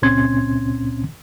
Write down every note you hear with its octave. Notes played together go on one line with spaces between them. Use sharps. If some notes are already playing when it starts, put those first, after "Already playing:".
C#2 A#2 C4 C#4 C6 G#6